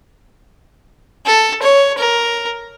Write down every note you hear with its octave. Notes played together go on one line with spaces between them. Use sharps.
A4
C#5
A#4